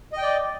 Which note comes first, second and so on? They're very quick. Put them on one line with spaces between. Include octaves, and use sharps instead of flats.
D#5 G5 D5